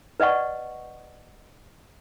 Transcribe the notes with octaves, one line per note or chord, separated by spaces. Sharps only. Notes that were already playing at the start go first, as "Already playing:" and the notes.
B4 D5 D#5 F#5 C#6